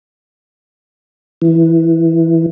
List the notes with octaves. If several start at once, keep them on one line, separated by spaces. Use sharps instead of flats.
E3